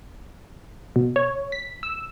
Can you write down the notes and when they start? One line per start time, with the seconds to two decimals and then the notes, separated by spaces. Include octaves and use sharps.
0.96 B2
1.16 C#5
1.52 B6
1.83 E6